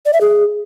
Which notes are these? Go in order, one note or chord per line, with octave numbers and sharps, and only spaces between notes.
D5
E5
G#4